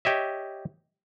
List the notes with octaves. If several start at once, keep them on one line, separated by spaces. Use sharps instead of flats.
G4 C#5 D#5 E5